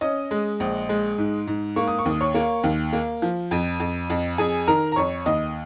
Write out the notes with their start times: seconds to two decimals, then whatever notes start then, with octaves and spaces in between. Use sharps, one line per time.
0.01 C#4 D#5 D#6
0.31 G#3
0.60 A#1
0.89 G#3
1.18 G#2
1.47 G#2
1.76 A#3 C#6
1.88 D#6
1.99 C#6
2.05 D#2 D#6
2.21 C#5 C#6
2.35 A#3
2.64 D#2
2.93 A#3
3.22 F3
3.51 F2
3.80 F2
4.10 F2
4.38 F2 G#4 G#5
4.67 D#3 A#4 A#5
4.92 A#5
4.96 F2 C#5 C#6
5.26 D#2 D#5 D#6